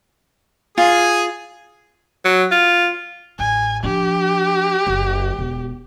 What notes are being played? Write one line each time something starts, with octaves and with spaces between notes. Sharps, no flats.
F4 G#4 G#5
F#3
F4
A1 G#5
F3 D4 G4
F#1
E1